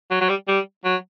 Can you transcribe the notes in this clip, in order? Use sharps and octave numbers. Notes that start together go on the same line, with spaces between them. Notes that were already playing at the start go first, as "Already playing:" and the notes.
F#3
F#3
G3
G3
F#3